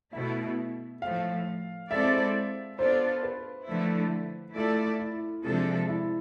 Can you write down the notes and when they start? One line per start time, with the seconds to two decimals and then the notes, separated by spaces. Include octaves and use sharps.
0.13 B2 A3 E4 E5
1.01 A2 F3 A3 F5
1.90 G#3 C4 E4 A4 D5 E5
2.78 B3 D4 F4 A4 C5 D5
3.23 B4
3.67 D3 F3 A3 E4
4.55 A3 E4 F4 A4 D5
4.99 E4
5.44 C3 F3 G#3 D4 F4 A4
5.88 E4